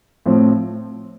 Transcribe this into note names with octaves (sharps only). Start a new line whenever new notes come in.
A2 F3 C4